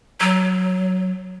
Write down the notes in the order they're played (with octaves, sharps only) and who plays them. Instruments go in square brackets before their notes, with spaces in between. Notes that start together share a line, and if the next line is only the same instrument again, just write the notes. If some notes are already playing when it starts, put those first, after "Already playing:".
[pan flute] F#3